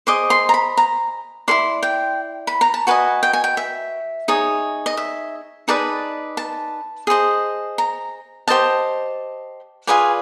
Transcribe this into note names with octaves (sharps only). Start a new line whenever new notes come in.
G#4 C5 D#5 D6
C6
A#5
B5
A#5
E4 A4 D5 C6
G5
B5
A#5
A5
F#4 B4 D#5 G#5
G5
G#5
G5
E5
D#4 G#4 C#5
D#5
E5
D#4 G#4 B4 D5 A5
A5
G#4 C5 D#5
A#5
G4 C5 D#5 A5
F4 G#4 B4 D5 G#5